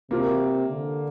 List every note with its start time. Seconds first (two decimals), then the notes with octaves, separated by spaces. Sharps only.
0.11 C3 A#3 F4 A#4
0.69 D3